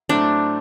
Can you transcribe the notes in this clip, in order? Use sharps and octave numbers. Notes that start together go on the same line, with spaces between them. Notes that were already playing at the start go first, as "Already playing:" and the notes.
A2 F#3 A3 C4 D4